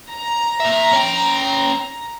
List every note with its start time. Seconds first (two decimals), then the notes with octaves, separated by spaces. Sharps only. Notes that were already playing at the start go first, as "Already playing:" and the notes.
0.11 A#5
0.60 A#2 E5
0.92 C#4 G5